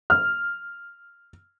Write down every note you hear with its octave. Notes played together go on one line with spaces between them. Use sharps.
F6